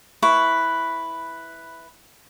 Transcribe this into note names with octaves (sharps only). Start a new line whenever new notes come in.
E4 B4 C#6